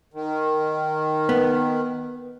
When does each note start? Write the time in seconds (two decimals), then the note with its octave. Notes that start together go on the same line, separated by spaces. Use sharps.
0.14 D#3
1.29 B3